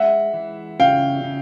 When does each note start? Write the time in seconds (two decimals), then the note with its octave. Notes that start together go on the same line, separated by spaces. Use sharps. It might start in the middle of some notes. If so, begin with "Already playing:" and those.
Already playing: G#3 E5 F#5
0.34 E3
0.80 C#3 F5 G5
1.24 C#3